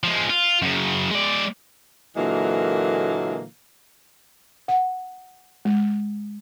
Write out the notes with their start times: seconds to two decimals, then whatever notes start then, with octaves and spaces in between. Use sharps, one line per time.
0.04 F3 G#3
0.30 F4
0.62 F#2 C#3
1.11 G#3 D5
2.16 A#2 D3 E3 F#3 G#3 A#3
4.68 F#5
5.65 G#3